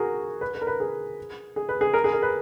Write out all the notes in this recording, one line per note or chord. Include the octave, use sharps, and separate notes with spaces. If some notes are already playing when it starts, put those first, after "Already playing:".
Already playing: F#4 G#4 A#4
B4
B4
A#4
B4
G#4
G#4
B4
G#4
A#4
G#4
A#4
B4